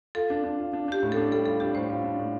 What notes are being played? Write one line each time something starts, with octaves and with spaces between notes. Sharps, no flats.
F4 A4
D4
D4
F4
D4
D4 G4
A2
A4
D4
G3 A4
F4 A4
D4 G4
A2 C5
F4
D4
A2